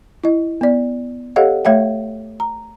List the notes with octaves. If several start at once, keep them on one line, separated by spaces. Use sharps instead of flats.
E4 D#5
B3 D5
G4 A4 C#5 D#5 F5 F#5
A3 C#5 E5 F5 G5
A#5